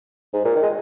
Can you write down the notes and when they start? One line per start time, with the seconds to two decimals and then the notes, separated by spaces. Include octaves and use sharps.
0.33 G#2
0.45 A#2
0.56 D#3
0.62 G#3